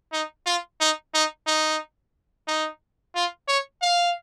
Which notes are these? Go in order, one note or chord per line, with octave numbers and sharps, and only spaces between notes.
D#4
F4
D#4
D#4
D#4
D#4
F4
C#5
F5